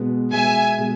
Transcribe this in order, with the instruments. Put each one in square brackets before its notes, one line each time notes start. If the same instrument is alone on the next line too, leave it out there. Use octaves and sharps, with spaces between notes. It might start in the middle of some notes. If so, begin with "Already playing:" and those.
Already playing: [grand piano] B2 G#3 B3
[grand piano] B2 G#3 B3 [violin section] E5 G#5
[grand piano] B2 G#3